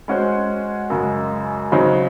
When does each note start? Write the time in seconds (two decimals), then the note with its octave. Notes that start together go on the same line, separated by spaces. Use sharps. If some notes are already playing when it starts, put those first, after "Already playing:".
0.08 G#3 C#4 F#4 C5
0.90 F#2 C#3 G#3
1.72 C#3 F#3 C4 D#4